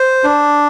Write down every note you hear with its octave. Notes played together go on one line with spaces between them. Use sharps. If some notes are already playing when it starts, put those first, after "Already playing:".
Already playing: C5
D4